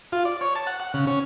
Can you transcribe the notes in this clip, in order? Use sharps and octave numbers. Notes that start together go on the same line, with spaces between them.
F4
D5
C#5
A5
F#5
F#5
C#3
C#4